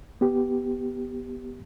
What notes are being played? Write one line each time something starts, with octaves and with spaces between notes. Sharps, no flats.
B3 G4